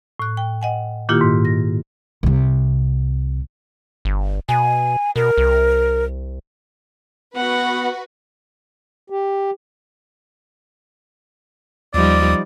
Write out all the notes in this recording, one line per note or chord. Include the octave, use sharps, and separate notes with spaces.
A2 F#6
G5
D#5 F#5 G#5
A#2 D#3 A#3 E4 F4 G4
G#2
A#6
C2 C3
G1
B2 G#5
B2 A#4
C2
B3 F#4 B4 F#5
G4
D#2 F3 G3 D#4 D5